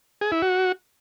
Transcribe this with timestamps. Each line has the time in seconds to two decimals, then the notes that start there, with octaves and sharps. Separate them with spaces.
0.21 G#4
0.32 E4
0.42 F#4